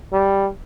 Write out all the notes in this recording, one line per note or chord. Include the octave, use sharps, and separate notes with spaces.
G3